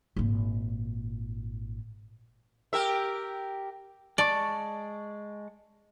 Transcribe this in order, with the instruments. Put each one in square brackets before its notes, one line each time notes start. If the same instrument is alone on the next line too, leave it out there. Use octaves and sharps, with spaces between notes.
[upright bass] G#1 A#2
[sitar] G4 A#4 E5
[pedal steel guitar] G#3 A5 C#6 [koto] D5